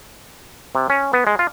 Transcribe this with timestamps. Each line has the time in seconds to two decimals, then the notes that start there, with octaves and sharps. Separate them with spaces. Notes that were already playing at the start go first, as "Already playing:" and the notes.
0.75 C3
0.90 C#4
1.13 B3
1.27 G#3
1.39 F4